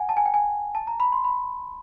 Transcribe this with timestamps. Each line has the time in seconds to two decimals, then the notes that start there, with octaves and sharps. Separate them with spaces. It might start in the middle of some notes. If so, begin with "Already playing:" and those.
Already playing: F#5 G#5
0.09 A5
0.17 G#5
0.26 G5
0.34 G#5
0.75 A5
0.87 A#5
1.00 B5
1.12 C6
1.24 B5